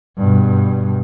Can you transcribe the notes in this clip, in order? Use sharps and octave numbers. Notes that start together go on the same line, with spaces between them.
G2 B2